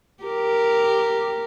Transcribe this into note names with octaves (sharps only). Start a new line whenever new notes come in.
G4 A#4